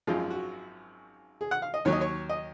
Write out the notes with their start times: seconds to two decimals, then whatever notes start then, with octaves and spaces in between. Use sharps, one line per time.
0.07 G#1 F#2 F3 G#3 F4
0.30 F#4
1.41 G#4
1.51 F#5
1.62 F5
1.74 D#5
1.85 D#2 D#3 F#3 C#5
1.92 D#5
2.01 C#5
2.29 D#5